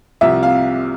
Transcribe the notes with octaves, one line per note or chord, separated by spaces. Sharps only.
C2 C3 F3 E5
F5